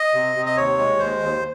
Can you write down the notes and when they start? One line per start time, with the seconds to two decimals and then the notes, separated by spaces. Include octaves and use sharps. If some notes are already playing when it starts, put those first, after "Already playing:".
Already playing: D#5
0.14 C3
0.36 C3
0.46 D#5
0.57 D#2 C#5
0.78 G#3
0.99 D#2 C5
1.20 D#2